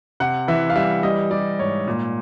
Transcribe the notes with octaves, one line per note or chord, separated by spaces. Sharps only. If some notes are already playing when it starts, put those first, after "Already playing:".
C3 F#5
E3 E5
F5
G3 E5
G3 D#5
G3 D5
G#2 C#5
A#2